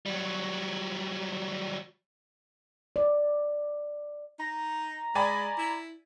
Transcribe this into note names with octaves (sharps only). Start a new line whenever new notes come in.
F#3 G3
D5
D#4 A#5
G#3 D5 G#5 B5
E4